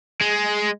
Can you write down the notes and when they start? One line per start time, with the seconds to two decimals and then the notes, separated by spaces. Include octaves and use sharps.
0.21 G#3